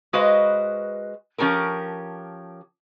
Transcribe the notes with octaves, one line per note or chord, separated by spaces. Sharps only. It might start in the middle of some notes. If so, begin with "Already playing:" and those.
G#3 F#4 B4 C5 D#5 F5
F3 C#4 G4 A4 A#4